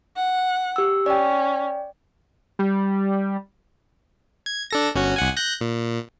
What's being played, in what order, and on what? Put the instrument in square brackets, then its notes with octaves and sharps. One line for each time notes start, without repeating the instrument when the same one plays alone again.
[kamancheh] F#5
[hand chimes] G4 E6
[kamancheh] C#4 [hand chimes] D5 G5
[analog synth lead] G3
[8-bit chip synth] G#6
D4 A4 A#6
G1 C#4 F#4
C2 F#5 G#5
F#6 G6 A#6
A#2